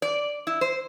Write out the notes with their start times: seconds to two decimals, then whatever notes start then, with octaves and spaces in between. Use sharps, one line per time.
0.02 D5
0.47 E4
0.61 C5